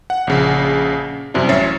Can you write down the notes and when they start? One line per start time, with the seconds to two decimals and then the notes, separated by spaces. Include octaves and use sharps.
0.10 F#5
0.27 A#1 C#3
1.34 F#2 C3 G3 E4
1.49 A1 C#4 C#5 E5 A6 C7